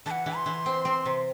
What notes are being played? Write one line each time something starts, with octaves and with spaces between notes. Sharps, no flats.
E3 A5
F#5
E3
C6
E3
C4
C4
C3